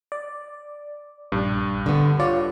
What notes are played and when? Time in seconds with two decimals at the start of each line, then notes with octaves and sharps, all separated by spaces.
0.12 D5
1.32 A#1 G2 D4
1.86 D3 B3
2.20 F4 C#5 D5